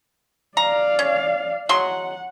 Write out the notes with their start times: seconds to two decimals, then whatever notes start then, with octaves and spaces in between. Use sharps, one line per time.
0.57 D5 F5 A#5
0.99 C#4
1.69 F#3 G#3 F#5 C6